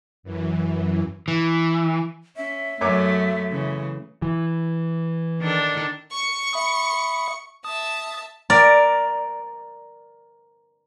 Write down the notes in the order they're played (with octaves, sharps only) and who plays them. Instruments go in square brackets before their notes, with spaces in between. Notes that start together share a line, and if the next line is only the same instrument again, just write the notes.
[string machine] F#2 E3
[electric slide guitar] E3
[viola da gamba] C#4 [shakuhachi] E5
[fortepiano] F#2 C#5 D6 [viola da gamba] F#3 A3
[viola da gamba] C#3 E3
[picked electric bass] E3
[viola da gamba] D#3 D4 A4
[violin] C#6 C#7
[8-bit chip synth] E5 B5 D#6
[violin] E5 A5 [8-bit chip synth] D#6
[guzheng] A#4 D5